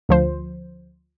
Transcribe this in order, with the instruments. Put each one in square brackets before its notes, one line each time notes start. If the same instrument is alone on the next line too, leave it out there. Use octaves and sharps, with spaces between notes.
[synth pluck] D2 F3 C5